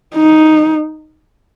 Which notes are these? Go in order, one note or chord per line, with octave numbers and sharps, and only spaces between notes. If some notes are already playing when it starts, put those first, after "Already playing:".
D#4